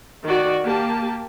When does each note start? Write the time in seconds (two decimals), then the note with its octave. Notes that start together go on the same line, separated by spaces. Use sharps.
0.24 D#3 F#4 D5
0.63 A#3 G4 A5